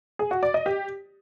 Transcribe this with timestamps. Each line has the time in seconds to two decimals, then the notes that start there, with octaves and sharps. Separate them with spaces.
0.19 G#4
0.31 F#4
0.43 D5
0.54 D#5
0.66 G4